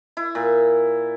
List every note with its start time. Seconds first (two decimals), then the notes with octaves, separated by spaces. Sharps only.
0.17 E4
0.35 A#2